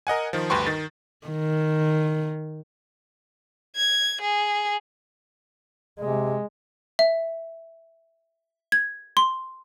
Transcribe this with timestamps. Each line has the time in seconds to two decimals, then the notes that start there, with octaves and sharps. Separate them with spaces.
0.07 A#4 D#5 F#5 G#5
0.33 D#3 F3
0.50 D2 G2 B4 G5 C6 C#6
0.67 D#3 A6
1.27 D#3
3.76 G#6
4.21 G#4
5.99 C3 G#3
6.99 E5
8.72 G#6
9.17 C6